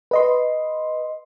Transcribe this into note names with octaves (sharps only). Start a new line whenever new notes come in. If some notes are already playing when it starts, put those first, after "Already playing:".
B4 D#5 C6